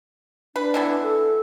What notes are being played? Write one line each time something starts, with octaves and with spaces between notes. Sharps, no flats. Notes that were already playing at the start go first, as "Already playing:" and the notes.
D4 B4
D3 E3 B3
A4